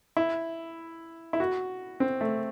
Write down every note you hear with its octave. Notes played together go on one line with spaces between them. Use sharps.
E4
E4
F#4
C4
A3